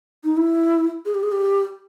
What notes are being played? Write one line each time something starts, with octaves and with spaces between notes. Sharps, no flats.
D#4
E4
G#4
G4
G#4
G4